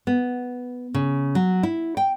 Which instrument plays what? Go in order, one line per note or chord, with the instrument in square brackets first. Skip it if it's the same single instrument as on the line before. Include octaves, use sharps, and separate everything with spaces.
[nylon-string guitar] B3
C#3
F#3
E4
G5